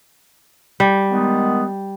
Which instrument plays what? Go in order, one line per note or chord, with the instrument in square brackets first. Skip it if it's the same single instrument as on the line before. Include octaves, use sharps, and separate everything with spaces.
[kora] G3
[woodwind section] D#3 G#3 B3